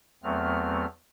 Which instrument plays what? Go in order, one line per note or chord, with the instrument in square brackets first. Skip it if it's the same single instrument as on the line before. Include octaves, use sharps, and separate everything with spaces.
[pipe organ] E2 F#3 A3 B3 C4 F6